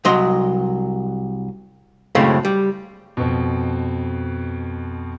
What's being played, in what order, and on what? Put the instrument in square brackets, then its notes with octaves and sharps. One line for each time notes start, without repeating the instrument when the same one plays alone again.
[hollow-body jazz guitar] C2 F#3 D#5 C6
F#2 A2 C#3 G#3 C4
G3
[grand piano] F2 B2